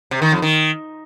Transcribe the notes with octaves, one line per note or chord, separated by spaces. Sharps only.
C3
D#3
F2
D#3